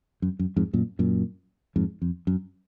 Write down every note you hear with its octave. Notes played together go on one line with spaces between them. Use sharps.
F#2
F#2
F2 G#2
F#2 A#2
F#2 A#2
F2 G#2
F2
F#2